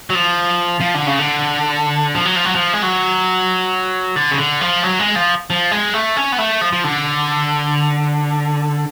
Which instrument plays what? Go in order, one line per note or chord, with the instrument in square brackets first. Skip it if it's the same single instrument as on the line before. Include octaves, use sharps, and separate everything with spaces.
[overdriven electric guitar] F#3
F3
F3
D3
C#3
D3
F3
F#3
F3
F#3
F3
G#3
F#3
D3
C#3
D3
F3
F#3
G#3
F3
F3
G#3
A3
C#4
B3
A3
F3
F3
D3